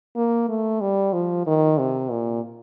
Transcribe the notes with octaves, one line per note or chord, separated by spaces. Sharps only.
A#3
A3
G3
F3
D#3
C3
A#2